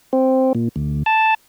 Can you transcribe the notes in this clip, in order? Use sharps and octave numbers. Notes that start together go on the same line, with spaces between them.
C4
A#2
D2
A5